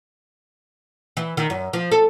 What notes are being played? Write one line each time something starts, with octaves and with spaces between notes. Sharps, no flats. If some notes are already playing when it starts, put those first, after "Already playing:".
E3
D#3
F#2
F3
A4